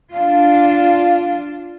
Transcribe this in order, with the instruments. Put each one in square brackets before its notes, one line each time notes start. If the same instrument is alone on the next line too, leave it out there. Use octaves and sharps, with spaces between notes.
[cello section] D4 F4 [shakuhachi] F5